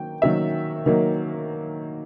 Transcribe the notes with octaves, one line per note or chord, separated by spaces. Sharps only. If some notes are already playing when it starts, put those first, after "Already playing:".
Already playing: D#3 F#3 A#3 G5
D#3 F#3 A#3 E5
D#3 F#3 A#3